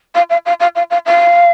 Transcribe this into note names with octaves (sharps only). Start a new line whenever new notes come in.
F5
F5
F5
F5
F5
F5
F5